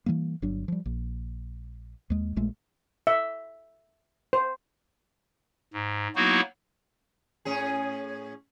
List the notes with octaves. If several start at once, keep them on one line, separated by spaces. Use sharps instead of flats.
E3 F#3 G3 A#3
G1 F#3 D4
F3 G3
A#1
D#2 G#3
A#1 A#2 G#3 A3
E5
C5
G#2
F#3 A#3 B3 D#4 E4 F#4
A2 C#4 G#4